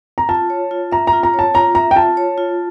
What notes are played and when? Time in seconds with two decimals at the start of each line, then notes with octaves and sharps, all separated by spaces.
0.18 A#5
0.29 F4 A5
0.50 C#5
0.71 F4
0.92 E5 A#5
1.07 A#5
1.13 F4
1.23 A#5
1.34 C#5
1.39 A5
1.54 F4 A#5
1.75 E5 A#5
1.91 G5
1.96 F4 A5
2.17 C#5
2.38 F4